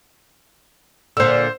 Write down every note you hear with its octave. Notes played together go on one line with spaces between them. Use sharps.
A#2 D3 C5 E6